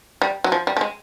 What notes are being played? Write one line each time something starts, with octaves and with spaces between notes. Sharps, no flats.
G3
F#3
F3
G3
A3
G#3